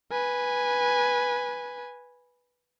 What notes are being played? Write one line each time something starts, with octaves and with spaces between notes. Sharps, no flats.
B4 G#5